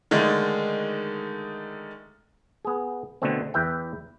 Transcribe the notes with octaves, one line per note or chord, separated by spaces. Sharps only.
D3 D#3 G#3 A3 D#4
B3 G#4
B2 D3 A3 B3 C4
E2 B4 E5 G5